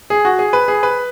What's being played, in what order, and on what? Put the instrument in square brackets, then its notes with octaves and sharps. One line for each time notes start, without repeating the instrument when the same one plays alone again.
[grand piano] G#4
F#4
G#4
B4
G#4
B4